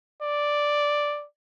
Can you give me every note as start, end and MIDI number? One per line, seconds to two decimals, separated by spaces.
0.22 1.26 74